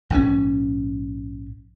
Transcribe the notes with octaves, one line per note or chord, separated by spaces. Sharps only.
A#1 G#2 F3 C#4